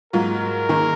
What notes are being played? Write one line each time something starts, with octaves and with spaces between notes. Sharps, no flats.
G#2 F#3 A#3 F4 A#4
D#3 A#3 D#4 G#4